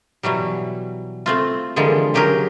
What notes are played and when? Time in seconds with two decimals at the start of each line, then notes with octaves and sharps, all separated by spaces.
0.23 B2 E3 F#3 G3
1.26 A3 C4 F4
1.76 D3 E3 F3 G3 G#3 A#3
2.14 C#3 F#3 G4 G#4 A#4